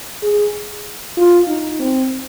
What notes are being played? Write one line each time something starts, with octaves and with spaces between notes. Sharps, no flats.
G#4
F4
D#4
C4